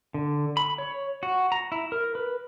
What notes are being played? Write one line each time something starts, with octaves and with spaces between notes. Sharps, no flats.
D3
B5
C#5
F#4
A#5
E4
A#4
B4